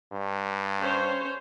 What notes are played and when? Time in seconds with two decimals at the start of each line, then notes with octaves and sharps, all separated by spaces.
0.12 G2
0.80 C#4 C5 C#5